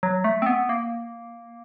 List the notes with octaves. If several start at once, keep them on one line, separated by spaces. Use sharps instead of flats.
F#3
A3
C4
B3
A#3